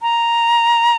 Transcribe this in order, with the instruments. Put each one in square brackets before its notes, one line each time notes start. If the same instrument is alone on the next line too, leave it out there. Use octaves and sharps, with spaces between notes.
[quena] A#5